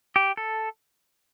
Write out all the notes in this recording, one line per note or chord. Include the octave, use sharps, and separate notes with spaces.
G4
A4